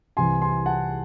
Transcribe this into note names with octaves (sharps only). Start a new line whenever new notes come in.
C2 C3 E3 G#5 C6
G#5 C6
F#5 A5